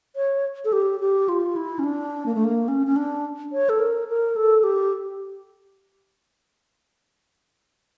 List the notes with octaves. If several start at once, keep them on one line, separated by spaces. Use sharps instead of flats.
C#5
A4
G4
G4
F4
E4
C#4
D4
A#3
A3
A#3
C#4
C#4
D4
C#5
A4
A#4
A#4
A4
G4